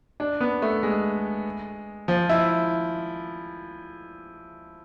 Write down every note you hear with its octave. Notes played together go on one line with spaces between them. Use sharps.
D4
B3
A3
G#3
F3
E4